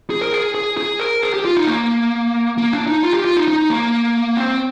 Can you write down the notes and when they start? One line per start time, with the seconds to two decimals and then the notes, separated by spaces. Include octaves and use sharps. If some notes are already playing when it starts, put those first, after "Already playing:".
0.10 G#4
0.21 A#4
0.33 G#4
0.55 G#4
0.77 G#4
1.00 A#4
1.22 G#4
1.34 G4
1.45 F4
1.56 D#4
1.67 A#3
2.58 A#3
2.73 D4
2.87 D#4
3.03 F4
3.14 G4
3.25 F4
3.36 D#4
3.48 D#4
3.70 A#3
4.37 C4